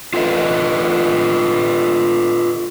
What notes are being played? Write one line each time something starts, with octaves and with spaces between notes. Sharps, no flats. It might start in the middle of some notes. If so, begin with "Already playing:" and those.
F4 A4 B4 D#5